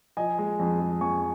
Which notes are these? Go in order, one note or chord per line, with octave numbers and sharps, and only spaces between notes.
F3 D#5 G#5
G#3
F2
G#3
F2 G#5 C#6